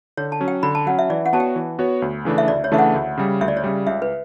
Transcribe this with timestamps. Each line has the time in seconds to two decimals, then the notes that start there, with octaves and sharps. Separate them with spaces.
0.17 D3 C#5
0.32 A5
0.40 F#3 C#4
0.48 G5
0.63 D3 B5
0.75 A5
0.86 F#3 C#4 F#5
0.99 E5
1.10 E3 D5
1.26 F#5
1.33 B3 F#4 C#5 A5
1.40 G5
1.56 E3
1.79 B3 F#4 C#5
2.02 D2
2.25 C#3 E3 A3 D4
2.38 E5
2.48 D2 D5
2.64 C#5
2.72 C#3 E3 A3 D4 E5
2.78 F#5
2.95 D2
3.17 C#3 G3
3.41 D2 E5
3.48 D5
3.57 C#5
3.64 C#3 G3
3.87 C#2 E5
4.02 B4